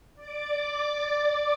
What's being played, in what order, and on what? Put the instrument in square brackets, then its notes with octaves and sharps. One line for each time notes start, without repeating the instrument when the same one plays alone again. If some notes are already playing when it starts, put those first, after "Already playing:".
[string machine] D5 D6